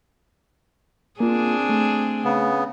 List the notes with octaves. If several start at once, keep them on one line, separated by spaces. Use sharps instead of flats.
A#3 C4 D4 F4 G#4
A3
C#3 B3